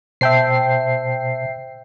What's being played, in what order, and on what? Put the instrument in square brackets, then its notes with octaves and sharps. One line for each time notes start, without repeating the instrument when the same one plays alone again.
[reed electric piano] B2 C5 A5 [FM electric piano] E5 G5 C7